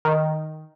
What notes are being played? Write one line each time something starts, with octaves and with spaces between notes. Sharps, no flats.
D#3